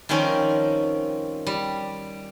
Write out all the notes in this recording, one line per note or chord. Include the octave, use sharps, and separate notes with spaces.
D#3 F3 G3 C4 C#4 A#4
G3